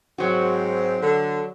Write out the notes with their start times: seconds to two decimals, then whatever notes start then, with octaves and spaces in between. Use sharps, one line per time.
0.18 G#2 F#3 C4 F#4
1.01 D3